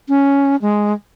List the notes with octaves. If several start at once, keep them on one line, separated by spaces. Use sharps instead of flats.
C#4
G#3